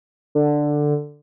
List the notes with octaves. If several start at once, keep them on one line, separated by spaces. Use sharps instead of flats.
D3